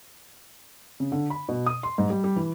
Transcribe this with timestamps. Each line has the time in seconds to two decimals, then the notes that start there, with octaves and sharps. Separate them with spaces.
1.00 C#3
1.12 D3
1.30 B5
1.49 B2
1.66 D#6
1.83 C6
1.98 G#2
2.10 G3
2.24 G3
2.36 E3